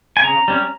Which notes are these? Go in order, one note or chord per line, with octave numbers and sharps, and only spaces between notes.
G#5
C#3 A#5
G3 C#4